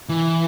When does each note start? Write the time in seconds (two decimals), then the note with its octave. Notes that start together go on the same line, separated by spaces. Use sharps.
0.09 E3